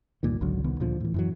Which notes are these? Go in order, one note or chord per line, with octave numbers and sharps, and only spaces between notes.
C#2 G2 A#2 D#3
G#1 C#2 D3 F#3
C2 D#3 B3
D2 A#2 D3 F3
A2 E3
F#2 E3 F#3